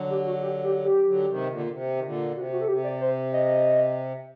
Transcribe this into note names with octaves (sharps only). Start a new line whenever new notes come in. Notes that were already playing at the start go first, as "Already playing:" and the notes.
Already playing: D3 F#3
G4
F#4
G4
G4
G4
D3 F#3
C3 D#3
A#2 D3
D3
C3
D#3
A#2 D3
C3 F#4
F#4
A4
C3 G4
D5
C5
D#5